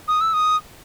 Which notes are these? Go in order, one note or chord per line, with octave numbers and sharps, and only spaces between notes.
D#6
E6
D#6